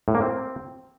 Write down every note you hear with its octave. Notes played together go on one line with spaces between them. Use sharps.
A2
A#3
C4